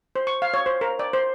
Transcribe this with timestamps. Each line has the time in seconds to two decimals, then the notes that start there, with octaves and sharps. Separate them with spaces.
0.16 C5
0.27 C#6
0.42 F5
0.54 C#5
0.66 C5
0.81 A#4
0.99 D5
1.13 C5